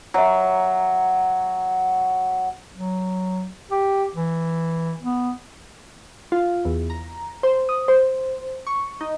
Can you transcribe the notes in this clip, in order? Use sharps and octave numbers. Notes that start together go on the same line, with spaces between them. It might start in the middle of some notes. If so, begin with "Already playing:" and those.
F#3 E5 A#5
F#3
G4
E3
B3
F4
E2
A#5
C5
D#6
C5
C#6
D#4